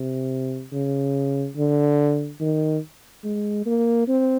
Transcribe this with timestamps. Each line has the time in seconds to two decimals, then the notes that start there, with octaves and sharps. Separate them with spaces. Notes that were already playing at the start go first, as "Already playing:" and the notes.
Already playing: C3
0.72 C#3
1.57 D3
2.40 D#3
3.24 G#3
3.66 A#3
4.08 C4